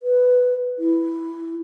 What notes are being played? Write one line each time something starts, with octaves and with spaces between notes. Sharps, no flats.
B4
E4